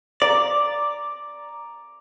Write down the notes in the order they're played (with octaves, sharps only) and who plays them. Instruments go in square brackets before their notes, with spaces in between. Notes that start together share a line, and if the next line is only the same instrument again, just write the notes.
[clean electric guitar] D5 [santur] A#5 D6